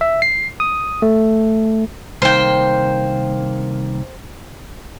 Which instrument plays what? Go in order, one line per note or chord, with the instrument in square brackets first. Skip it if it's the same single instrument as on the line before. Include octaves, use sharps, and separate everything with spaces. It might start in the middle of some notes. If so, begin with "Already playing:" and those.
[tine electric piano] E5
C7
D#6
A3
[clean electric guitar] C2 D#3 A#3 [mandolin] C5 G5